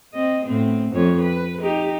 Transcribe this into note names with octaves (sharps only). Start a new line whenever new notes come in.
C4 D#5
A2 B3 C4
F2 C#5
B4
D#4 G4